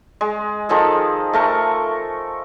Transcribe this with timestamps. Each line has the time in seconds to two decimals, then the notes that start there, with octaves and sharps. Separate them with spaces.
0.21 G#3
0.69 D#3 F3 G#4 A4
1.33 A3 A#4 C#6